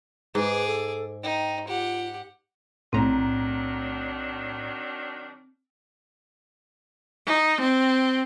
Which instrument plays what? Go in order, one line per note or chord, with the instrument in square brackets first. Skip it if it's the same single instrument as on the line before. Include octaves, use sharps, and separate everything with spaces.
[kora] G#2 [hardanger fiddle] G#4 D6 [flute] B4
[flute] A4
[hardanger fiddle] D#4 [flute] G5
[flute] F4 [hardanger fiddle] G4 F#5
[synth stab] B1 A2 A#5 [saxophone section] D#3 F#3 D4 [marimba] C4
[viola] D#4
C4